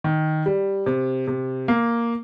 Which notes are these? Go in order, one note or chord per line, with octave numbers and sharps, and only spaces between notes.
D#3
G3
C3
C3
A#3